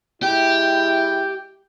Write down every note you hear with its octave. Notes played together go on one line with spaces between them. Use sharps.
G#3 E4 G4 G5